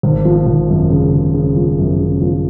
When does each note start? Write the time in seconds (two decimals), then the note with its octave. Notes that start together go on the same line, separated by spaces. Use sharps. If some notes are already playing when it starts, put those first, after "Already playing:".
0.03 G#1
0.25 F3
0.46 G#1
0.69 F#2
0.91 C#3
1.12 C#3
1.34 C#3
1.56 F3
1.78 F#2
2.00 C#3
2.21 F3